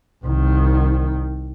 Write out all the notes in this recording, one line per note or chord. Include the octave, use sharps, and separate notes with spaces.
C2 D#3